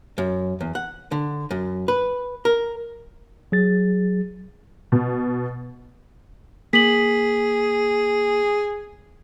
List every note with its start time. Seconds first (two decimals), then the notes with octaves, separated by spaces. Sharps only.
0.18 F#2
0.61 E2
0.75 F#5
1.12 D3
1.51 F#2
1.88 B4
2.45 A#4
3.52 F#3 G#4 A6
4.92 B2
6.73 A#3 G#4 B6 F#7